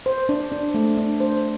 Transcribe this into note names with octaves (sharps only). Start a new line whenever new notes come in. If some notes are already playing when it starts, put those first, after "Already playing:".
C5
D4
D4
A3
D4
C5